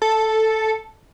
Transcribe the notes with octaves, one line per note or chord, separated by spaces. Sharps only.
A4